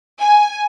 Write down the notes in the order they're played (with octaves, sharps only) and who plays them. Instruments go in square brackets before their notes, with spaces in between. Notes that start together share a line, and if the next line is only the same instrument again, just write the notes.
[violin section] G#5